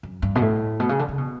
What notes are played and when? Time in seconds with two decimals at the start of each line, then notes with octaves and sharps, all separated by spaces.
0.03 F#2
0.22 G2
0.35 B2
0.42 A2
0.80 B2
0.89 C#3
0.99 D3
1.09 C#3
1.18 B2